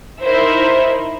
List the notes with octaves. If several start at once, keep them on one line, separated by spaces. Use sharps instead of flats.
D#4 E4 A#4 C5 E5